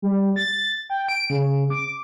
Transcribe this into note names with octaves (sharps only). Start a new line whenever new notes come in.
G3
A6
G5
D7
C#3
D6